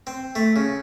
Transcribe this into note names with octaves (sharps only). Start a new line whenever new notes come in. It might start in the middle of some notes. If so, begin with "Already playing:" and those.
C4
A3
C#3